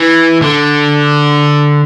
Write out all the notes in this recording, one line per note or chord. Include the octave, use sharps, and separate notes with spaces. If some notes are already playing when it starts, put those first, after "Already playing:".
Already playing: E3
D3